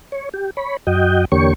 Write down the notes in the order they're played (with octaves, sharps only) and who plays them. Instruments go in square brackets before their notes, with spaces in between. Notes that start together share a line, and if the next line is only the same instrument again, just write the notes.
[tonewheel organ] C#5
G4
C#5 B5
F#2 F#4 D#5 G5
E2 D3 A#3 G4 C#5 C#6